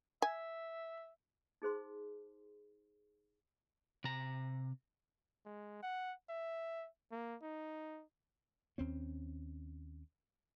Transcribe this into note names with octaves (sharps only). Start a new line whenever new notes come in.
E5 G#5
D#4 G#4 C5 C6
C3 A#5
G#3
F#5
E5
A#3
D#4
D#2 C4 C#4